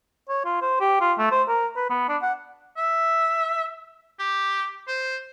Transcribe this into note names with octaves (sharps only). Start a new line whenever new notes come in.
C#5
F4
C5
G4
F4
A3
C5
A#4
B4
B3
D4
F#5
E5
G4
C5